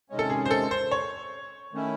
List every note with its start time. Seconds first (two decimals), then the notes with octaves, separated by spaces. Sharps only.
0.10 C3 D#3 G#3 C#4
0.19 A4
0.30 G#4
0.46 C5
0.51 A4
0.71 C5
0.91 C#5
1.73 D#3 A3 C#4 E4